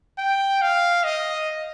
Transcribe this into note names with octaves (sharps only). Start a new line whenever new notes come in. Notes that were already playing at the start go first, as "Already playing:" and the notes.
G5
F5
D#5